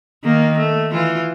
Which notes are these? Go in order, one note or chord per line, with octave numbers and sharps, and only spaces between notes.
D#3 A#3
A3
E3 F4